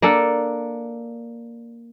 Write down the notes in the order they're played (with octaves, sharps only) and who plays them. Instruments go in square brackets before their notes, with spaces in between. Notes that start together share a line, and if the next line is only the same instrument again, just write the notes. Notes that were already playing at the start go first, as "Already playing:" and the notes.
[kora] A#3 D4 A4